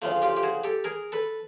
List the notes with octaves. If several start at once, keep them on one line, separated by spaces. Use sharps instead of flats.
D2 C#3 F3 A3
F4 G4
G4
F#4 G#4
G4 A4
G#4 A#4
A4 B4